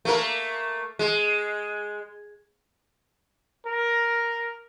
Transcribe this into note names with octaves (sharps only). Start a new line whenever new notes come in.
A3 A#3 A#4
G#3
A#4